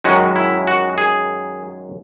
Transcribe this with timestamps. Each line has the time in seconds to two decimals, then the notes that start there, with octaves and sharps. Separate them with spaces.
0.04 F#2 D#3 G#3 C#4 F#4
0.36 E4
0.67 F#4
0.98 G#4